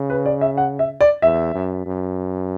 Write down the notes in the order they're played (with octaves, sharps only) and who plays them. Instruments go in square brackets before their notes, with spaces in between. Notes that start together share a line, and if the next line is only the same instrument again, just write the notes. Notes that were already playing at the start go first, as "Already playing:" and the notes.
Already playing: [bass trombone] C#3
[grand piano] B4
D5
E5
F#5
E5
D5
[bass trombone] E2 [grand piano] E5
[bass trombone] F#2
F#2